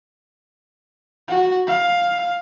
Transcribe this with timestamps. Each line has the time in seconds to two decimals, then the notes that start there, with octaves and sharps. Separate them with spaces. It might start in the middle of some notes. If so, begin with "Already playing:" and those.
1.27 F#4
1.67 F5